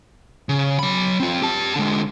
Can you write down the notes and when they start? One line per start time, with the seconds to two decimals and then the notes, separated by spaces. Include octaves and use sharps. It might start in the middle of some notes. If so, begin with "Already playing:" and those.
0.49 C#3
0.79 F#3 B5
1.20 C4 F4
1.42 G4 A5
1.75 D3 G#3